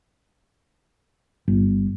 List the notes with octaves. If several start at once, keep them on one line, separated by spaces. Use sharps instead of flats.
G1